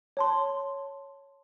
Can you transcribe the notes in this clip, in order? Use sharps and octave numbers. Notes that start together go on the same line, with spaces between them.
C#5 A5 C6